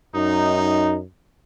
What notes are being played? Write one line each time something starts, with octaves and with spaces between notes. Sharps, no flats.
F#2 D#4